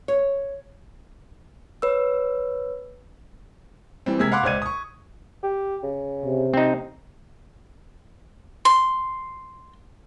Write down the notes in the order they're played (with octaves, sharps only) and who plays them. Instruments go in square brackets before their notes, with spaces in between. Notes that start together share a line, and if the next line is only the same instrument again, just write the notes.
[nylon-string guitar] C#5
[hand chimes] B4 C#5 E6
[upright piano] E3 G3 C4
C3 G#3 A#3 E6 G#6 B6
F5 F#5 B5 C6 D6 F#6
C#2 C5 D5 G#6 D#7
C#6 D#6
[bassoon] G4
C#3
[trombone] C3
[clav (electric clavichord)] C4 D#4
[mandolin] C6